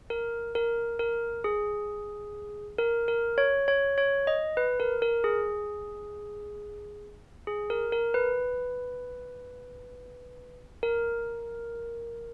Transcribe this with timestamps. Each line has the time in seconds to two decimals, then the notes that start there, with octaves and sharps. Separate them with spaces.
0.10 A#4
0.55 A#4
0.99 A#4
1.44 G#4
2.78 A#4
3.08 A#4
3.38 C#5
3.68 C#5
3.98 C#5
4.27 D#5
4.57 B4
4.80 A#4
5.02 A#4
5.24 G#4
7.47 G#4
7.70 A#4
7.92 A#4
8.14 B4
10.83 A#4